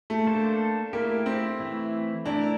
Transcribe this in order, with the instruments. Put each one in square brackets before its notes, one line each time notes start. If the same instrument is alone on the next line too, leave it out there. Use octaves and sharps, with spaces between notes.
[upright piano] A3
[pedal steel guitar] A#3 D4 A4 C5
[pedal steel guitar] A3 E4 G4 [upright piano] A#3
[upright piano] C4
[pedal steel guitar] E3 A3 E4
[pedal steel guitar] A3 C4 E4 A#4 [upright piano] D4